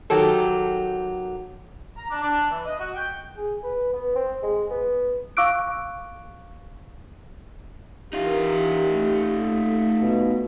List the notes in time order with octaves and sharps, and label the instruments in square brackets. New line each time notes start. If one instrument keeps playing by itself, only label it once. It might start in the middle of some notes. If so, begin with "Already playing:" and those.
[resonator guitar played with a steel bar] D#3 F#3 G4 A4
[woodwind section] A#5
D4
D4
E3
D#5
F#4
G5
[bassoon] G#4
B4
B3
C4
G#3
B3
[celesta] F5 C#6 D6 E6 F#6 D7
[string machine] E3 A#4 [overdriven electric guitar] D#4 F4 [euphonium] G4
[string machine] A3
[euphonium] B2